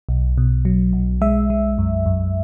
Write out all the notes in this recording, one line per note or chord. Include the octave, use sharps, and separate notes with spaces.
B1
B2
F#3
B1
G#3 E5
G#3
F#2
F#2